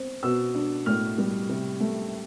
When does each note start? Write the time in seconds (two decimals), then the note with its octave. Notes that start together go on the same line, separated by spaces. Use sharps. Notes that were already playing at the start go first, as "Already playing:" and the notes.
Already playing: C4
0.23 B2 E6
0.55 D4
0.86 A2 F6
1.18 G3
1.49 C3
1.80 A3